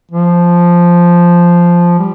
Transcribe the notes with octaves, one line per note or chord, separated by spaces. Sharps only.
F3
G3